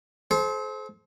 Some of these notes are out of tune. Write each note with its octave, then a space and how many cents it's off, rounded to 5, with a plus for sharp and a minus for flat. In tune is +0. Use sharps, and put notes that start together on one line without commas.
A4 -45 C5 +0